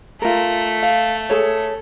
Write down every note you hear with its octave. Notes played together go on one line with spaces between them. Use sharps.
A3 F4 A#4
F5
G#4 A4 C#5